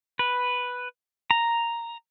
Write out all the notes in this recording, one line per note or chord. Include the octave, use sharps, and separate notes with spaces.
B4
A#5